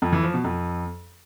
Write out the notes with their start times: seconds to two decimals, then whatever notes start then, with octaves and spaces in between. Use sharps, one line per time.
0.02 F2
0.13 E3
0.23 F3
0.34 B2
0.44 F2